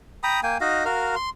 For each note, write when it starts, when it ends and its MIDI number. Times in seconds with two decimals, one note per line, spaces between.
0.23 0.40 79
0.23 0.40 82
0.23 0.40 83
0.23 0.40 87
0.43 0.58 58
0.43 0.58 79
0.43 0.58 80
0.61 0.85 63
0.61 0.85 66
0.61 0.85 75
0.61 0.85 77
0.85 1.15 66
0.85 1.15 70
0.85 1.15 77
1.16 1.30 84